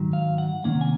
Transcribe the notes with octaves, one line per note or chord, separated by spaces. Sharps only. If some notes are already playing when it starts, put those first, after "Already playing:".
Already playing: G#2 D#3 F#3
F5
F#5
C3 D#3 A#3 C#4 F#5
G#5